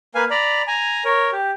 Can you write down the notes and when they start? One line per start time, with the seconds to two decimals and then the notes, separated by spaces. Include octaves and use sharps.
0.15 A#3 B4 F5 G#5
0.30 D5 A#5 B5
0.67 G#5 A#5
1.05 A#4 C#5
1.32 G4